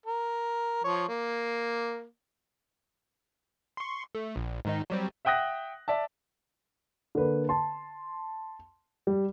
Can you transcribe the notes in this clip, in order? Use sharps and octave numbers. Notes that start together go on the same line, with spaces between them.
A#4
F3 C#5
A#3
C6 C#6
A3
A#1
G#2 D#3 D#4
F#3 G3 C4
E5 F#5 G5 D#6 F#6 A#6
D5 E5 A5
D3 A#3 B4
A5 C6
G3